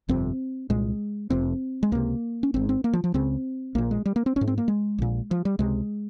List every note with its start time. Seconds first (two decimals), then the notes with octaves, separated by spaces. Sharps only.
0.09 G1 F2 C3 C4
0.70 C2 A#2 G#3
1.30 F1 F2 C3 C4
1.83 G#3
1.92 C#2 C3 A#3
2.43 C#4
2.54 G#1 G#2 C4
2.69 C4
2.84 A#3
2.93 F3
3.04 F3
3.14 C#2 C#3 C4
3.75 A#1 A#2 A#3
3.91 G#3
4.06 G3
4.16 A#3
4.26 C4
4.36 G#1 C#4
4.41 G#2
4.47 C4
4.58 A#3
4.68 G#3
4.98 A#1 A#2
5.31 F3
5.45 G3
5.59 C#2 C3 G#3